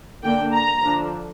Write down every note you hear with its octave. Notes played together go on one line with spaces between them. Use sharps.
D3 A#3 D4 G5
A#5
D3 F3 D4